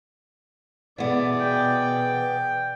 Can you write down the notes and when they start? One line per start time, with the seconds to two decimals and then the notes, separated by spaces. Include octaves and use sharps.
0.98 B2 E3 B3 G#4 D5
1.40 G5